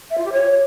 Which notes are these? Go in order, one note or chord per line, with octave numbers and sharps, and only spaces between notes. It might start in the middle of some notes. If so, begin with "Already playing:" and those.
E5
F4
G4
C#5